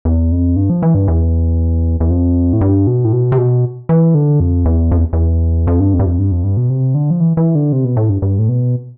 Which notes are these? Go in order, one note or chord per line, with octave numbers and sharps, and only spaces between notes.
E2
F2
G2
F3
E3
G2
E2
E2
F2
A2
G2
B2
A2
B2
C3
B2
E3
D3
F2
E2
F2
E2
E2
F2
G2
F2
G2
F2
G2
F2
G2
B2
C3
D3
F3
E3
E3
D3
C3
B2
A2
G2
G2
A2
B2